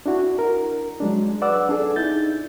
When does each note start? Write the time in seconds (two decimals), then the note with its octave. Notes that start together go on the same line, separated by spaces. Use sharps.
0.06 D4 E4 F#4
0.39 A#4
1.00 F#3 G#3 D4
1.42 B4 D5 F#5 D6 E6
1.69 D4 G#4 A4
1.96 D#4 E4 G6 A6